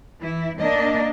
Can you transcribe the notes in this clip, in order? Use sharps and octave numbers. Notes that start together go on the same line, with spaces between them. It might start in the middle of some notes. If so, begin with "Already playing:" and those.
E3 E4
A#3 D4 D#5